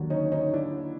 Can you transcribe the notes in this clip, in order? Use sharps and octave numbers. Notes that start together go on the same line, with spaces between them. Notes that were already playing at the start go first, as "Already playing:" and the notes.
Already playing: D#2 D3 F#3
C#4 D#4
C#4 D#4
D4 E4